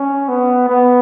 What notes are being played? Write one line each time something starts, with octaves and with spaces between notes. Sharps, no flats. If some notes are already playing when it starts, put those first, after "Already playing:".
Already playing: C#4
B3
B3